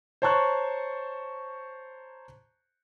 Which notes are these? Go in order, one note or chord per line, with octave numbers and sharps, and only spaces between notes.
C5 C#5 A5 A#5 C#6 F#6